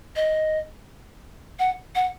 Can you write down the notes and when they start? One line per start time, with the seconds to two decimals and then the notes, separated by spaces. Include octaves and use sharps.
0.16 D#5
1.59 F#5
1.95 F#5